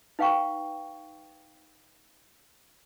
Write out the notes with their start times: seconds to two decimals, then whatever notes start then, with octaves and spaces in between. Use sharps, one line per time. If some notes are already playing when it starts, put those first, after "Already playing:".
0.19 D#4 B4 F5 G5 C#6